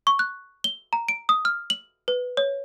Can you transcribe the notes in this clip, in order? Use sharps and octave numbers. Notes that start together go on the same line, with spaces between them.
C#6
F#6
G7
A#5
D7
D#6
F6
F#7
B4
C#5